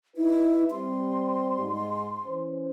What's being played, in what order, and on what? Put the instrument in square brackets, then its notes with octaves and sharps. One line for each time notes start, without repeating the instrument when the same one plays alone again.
[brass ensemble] D#4 B4 [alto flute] E4
[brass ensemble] G3 C4 [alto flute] C6
[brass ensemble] G#2
E3 C#4 C5